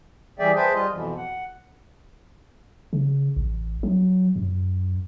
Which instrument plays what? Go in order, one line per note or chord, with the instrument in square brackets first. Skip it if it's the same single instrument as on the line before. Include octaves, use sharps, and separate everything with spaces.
[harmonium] E3 G3 G#4 D5 E5 G5
G#4 B4 C5 E5 G5 A5
G3 F4 D#5
F2 B2 E3
F#5
[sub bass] C#3
A1
F#3
F#2